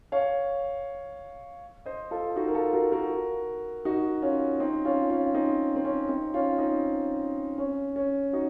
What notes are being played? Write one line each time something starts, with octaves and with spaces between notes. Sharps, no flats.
C#5 F5
C5 D#5
F4 A4
D#4 F#4
A#4
F4 A4
F#4 A#4
F#4 A#4
D#4 F#4
C#4 F4
C4 D#4
C#4 F4
C#4 F4
C4 D#4
C4
C#4
C4 D#4
C#4 F4
C4 D#4
C#4
C#4
D#4 F#4